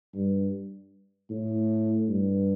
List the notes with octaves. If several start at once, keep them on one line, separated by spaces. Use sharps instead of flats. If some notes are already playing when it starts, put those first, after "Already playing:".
G2
A2
G2